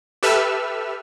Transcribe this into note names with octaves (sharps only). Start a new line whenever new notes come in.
G4 A4 B4 E5 E6 F6